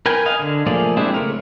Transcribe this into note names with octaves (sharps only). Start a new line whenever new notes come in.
A#4 B4 G5 G#5
D#5 F5 G#5
D3
F3 A3 A#3 G#4 D5
G#3 C4 D4 E4 G4
C#3 A3 A#4